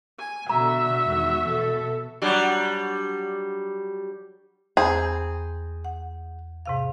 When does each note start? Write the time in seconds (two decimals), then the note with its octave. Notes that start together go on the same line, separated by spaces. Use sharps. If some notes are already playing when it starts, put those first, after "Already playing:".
0.19 G#5
0.49 B2 D3 F#4 E5 A#5
1.05 E2 G#2 D#3
1.42 B2 E3 A4
2.22 F#3 G3 D4
4.77 E2 C4 G#4 A#5 B5
5.85 F#5
6.66 G#2 C3 F5